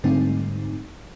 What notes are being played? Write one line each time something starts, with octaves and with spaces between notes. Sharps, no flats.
G#2 D3 G3 A3 C4 D#4